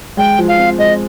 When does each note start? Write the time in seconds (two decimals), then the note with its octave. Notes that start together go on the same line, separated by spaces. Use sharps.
0.17 G#3 G5
0.38 F3
0.48 F5
0.59 C4
0.78 G#3 D#5